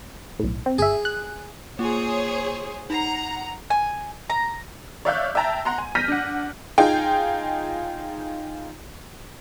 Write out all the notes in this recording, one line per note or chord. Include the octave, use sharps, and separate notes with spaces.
B1 A2
C4
G1 G#4 E5
F#6
A#3 F4 G#4 C5 C#5
D#4 F#5 A#5 C7
G#5
A#5
C#5 D5 E5 F5 F#6 G6
E5 G5 A5 A#5
F#5 A#5 C6
G#5
F6 G6 A#6 B6 D#7
D4 F#5
D#4 F4 G#4 G5